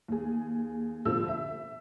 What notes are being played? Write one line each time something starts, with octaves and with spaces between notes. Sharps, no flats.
D#2 G#4
B2 D3 F3 E6
E5